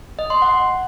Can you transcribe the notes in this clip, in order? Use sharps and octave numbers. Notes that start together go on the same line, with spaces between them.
D#5
C6
F#5